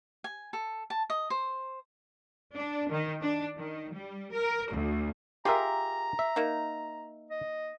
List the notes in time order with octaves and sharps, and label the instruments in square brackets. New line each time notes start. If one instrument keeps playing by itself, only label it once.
[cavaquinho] G#5
A4
A5
D#5
C5
[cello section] D4
D#3
D4
D#3
G3
A#4
D2
[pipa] F4 G#4 A#4 [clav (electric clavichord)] G4 E5 [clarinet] A#5
[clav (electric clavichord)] E5
[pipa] A#3 D#4
[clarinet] D#5